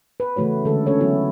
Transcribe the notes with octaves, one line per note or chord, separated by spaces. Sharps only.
B4
C#3 E3 A3 F#4 C#5
D3 G#3 A4
C#4 A4 C#5
D3 F#3 B3 E4 F#4 A4